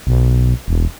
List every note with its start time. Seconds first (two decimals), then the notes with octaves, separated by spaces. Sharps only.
0.07 B1
0.68 E1